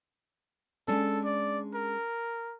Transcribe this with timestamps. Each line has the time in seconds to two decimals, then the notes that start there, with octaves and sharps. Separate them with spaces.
0.88 G#3 C#4 D4 A4
1.25 D5
1.74 A#4